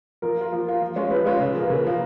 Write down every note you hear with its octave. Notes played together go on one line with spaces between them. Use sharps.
F3 A#4
A#3 F4
F3
A#3 F4
F3
G#3 C#4 F4
F3 B4
G#3 C#4 F4
C#3
F3 A#3
B4
C#3 A#4
F3 A#3